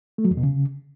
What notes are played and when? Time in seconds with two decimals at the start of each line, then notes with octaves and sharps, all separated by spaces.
0.18 A3
0.25 F#3
0.31 E2
0.37 B2
0.43 C#3